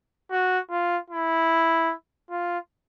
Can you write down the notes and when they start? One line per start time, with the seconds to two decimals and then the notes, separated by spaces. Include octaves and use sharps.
0.31 F#4
0.70 F4
1.10 E4
2.30 F4